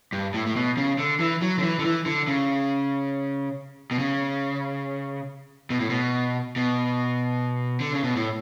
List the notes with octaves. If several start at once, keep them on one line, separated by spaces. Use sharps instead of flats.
G2
A2
A2
B2
C#3
D3
E3
F#3
D3
E3
D3
E3
D3
C#3
B2
C#3
B2
A2
B2
B2
D3
C#3
B2
A2